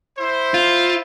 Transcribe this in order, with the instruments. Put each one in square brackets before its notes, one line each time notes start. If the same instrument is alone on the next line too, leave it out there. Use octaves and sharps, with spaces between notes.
[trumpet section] E4 C5
[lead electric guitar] F4